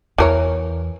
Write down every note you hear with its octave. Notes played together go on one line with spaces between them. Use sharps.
E2 E3 A#4 C#5